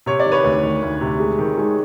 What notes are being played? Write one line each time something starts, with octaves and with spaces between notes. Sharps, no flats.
C3 C#5
D5
D#3
B4 C#5
D2
D#3
D2
C3
G#3
D#3
G#3